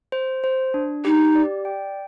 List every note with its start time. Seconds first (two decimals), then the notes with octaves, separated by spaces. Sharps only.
0.12 C5
0.44 C5
0.74 D4
1.05 D#4 G4
1.35 D5
1.65 G5